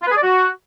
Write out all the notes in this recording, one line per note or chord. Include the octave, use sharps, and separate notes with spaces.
F4
B4
G#4
D5
F#4